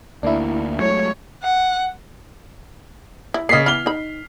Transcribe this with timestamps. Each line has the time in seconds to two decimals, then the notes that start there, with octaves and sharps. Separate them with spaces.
0.23 D2 A#3 D4 E4
0.80 F#3 G#3 A3 C#5
1.43 F#5
3.34 E4
3.49 C#3 A#3 D#5 B6 C7
3.66 E3 B3 B5 F6 G7
3.86 D#4 B5